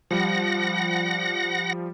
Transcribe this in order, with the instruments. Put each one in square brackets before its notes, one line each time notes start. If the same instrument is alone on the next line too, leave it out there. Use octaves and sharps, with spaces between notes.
[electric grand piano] F3 G3 [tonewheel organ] F#5 A#6